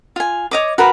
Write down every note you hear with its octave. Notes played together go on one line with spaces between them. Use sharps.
F4 G#5
C#5 D#5 D6
F#4 A#4 B4 B5